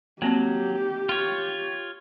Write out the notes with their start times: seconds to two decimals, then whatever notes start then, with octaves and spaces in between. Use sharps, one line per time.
0.22 F#3 A#3 C4 G4 A5
1.09 F4 C#5